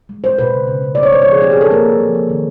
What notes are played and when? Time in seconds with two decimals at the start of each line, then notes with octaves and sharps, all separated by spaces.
0.09 G#3
0.24 G#3 C5
0.38 B2 B4
0.53 C#3
0.67 C#3
0.83 C#3
0.95 B3 D5
1.03 C#5
1.12 G#3 C5
1.22 C#5
1.27 F3 G#4
1.41 C4 G4
1.51 G#4
1.56 F3 A4
1.71 A#3 A#4
1.85 A#3
2.00 F3
2.15 A#3
2.30 D#3